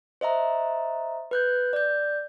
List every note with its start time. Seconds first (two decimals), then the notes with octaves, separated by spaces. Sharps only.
0.21 C5 D#5 E5 A#5
1.31 B4 F#6 G6
1.73 D5 G6